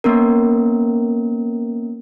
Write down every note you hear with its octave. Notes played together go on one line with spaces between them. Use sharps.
A#3 B3 C#4 A#4